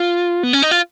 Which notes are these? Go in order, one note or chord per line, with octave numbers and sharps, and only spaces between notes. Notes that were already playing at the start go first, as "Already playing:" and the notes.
Already playing: F4
B3
C#4
D#4
F4